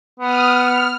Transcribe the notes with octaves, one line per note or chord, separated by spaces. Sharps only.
B3 D#6 F6
F6